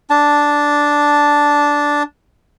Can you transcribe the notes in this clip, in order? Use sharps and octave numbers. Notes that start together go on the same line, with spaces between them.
D4 A5